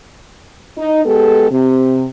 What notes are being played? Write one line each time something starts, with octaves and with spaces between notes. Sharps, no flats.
D#4
G#3 B3 G4 A4
C3